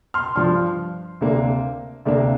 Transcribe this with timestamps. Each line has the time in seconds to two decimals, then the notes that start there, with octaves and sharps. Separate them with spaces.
0.14 C6 F6
0.36 G2 F3 D4 C6 F6
1.21 D2 C3 A#3 D4
2.05 D2 C3 A#3 D4 D5